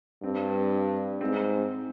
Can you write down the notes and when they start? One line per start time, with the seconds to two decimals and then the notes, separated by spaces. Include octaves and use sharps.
0.23 G2 C4
1.21 G#2 C4